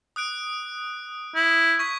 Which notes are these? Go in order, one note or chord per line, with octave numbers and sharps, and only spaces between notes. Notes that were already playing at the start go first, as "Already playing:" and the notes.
D#6 F#6 D7
E4
C#6 G#6 B6